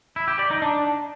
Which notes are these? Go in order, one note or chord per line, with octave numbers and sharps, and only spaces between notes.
E4
G4
D5
D#4
D4